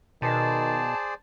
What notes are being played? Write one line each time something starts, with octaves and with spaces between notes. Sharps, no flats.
B2 D#3 G#4 C5 D5 A5